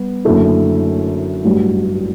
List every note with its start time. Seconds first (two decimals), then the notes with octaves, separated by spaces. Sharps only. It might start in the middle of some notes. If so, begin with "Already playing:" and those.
Already playing: G3 B3
0.24 F#1 F#2 D3 A3 E4
1.45 A1 G2 F#3